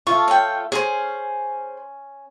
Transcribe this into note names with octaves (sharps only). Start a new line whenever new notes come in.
A3 F4 C#6
C#5 G5
C#4 G#4 C5